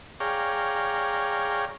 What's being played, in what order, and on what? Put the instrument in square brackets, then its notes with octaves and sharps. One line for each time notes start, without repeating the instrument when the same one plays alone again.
[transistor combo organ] G#4 C#5 D5 F5 G5 A#5